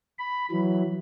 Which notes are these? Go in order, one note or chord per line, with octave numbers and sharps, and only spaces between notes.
B5
E3 F#3